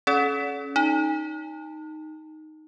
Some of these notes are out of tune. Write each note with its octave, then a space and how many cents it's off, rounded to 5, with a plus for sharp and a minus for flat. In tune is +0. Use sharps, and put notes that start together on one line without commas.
C#4 +0 A4 -40 D5 -40
D#4 +0 A5 +30